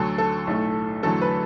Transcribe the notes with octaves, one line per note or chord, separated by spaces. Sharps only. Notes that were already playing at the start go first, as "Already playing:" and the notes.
Already playing: D2 D3 F#3 A4
A4
B1 A2 A3
E2 D3 F#3 A3 A4
B4